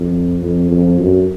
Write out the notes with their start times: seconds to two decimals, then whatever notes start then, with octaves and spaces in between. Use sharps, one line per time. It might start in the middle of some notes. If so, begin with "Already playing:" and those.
Already playing: F2
0.43 F2
0.71 F2
1.00 F#2